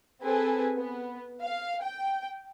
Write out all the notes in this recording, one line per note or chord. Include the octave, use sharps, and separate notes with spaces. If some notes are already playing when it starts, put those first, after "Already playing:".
C4 G#4 A4 B4 G#5
B3
F5
G5